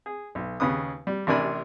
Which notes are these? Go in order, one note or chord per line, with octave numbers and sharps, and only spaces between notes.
G#4
B1
D#2 C#3 B4 D#6
G3
A1 C3 D4 A#4 G#5 B5